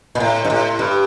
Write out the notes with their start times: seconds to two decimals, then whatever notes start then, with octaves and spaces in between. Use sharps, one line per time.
0.15 A#2
0.20 A2
0.45 G2
0.50 A2
0.79 G2